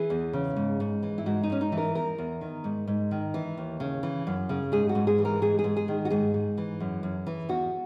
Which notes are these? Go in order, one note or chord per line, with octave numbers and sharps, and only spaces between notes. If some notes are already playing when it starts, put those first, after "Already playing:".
Already playing: E3 G#4
E2
C#3
G#2
G#2
E3
E4
G#2 F#4
D#4
G#2 C#4
D#4
E3
A#4
E2 A#4
E2
D#3
G#2
G#2
D#3
E3
D#2
C#3
E3
F#2
C#3
G#2 G#4
F#4
G#2
G#4
E3
A#4
G#2 G#4
G#4
G#2
G#4
D#3
F#4
G#2 G#4
G#2
E3
F#2
F#2
E3
E2 F#4